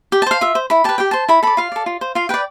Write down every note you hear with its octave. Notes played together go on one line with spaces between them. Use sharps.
G4
A5
C5 F5
F4 E5
C5
E4 B5
G4 B4 A5
G4 G5
C5 A5
E4 B5
A4 D5 B5
F4 F5
A4 D5
F4
C5
F4 F5
B4 D5 G5